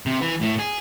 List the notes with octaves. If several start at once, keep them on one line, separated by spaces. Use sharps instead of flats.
C3
E3
A2
G#4